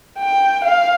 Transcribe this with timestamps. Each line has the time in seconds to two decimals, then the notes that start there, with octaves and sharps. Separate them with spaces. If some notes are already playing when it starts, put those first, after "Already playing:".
0.18 G5
0.65 F5